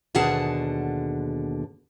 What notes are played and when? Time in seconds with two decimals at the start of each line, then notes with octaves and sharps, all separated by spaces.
0.15 D#2 B2 D3 G#4 F#5 A5